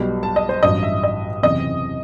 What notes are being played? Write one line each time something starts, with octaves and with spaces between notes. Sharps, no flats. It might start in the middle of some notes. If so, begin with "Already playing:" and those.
Already playing: B1 B2 G3
A5
D#5
C5
A1 G2 F#3 D#5
E5
D#5
F#1 E2 C3 D#5